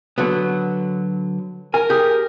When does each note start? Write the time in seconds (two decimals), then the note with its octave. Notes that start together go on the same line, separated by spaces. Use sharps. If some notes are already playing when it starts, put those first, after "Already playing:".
0.18 D3 F#3 B3
1.74 A#4 G#5
1.90 G4 G#4